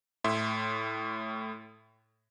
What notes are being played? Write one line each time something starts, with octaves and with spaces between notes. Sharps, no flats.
A2 E5 C6